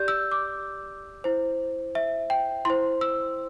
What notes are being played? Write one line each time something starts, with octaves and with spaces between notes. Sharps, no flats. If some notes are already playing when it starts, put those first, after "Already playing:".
Already playing: G4 D5 G6
E6
D6
E4 C5
E5
G5
E4 C5 C6
E6